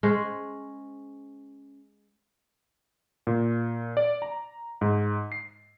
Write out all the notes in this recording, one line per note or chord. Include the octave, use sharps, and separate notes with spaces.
G#3 C#4 C5
A#2
D5
A#5
G#2
C7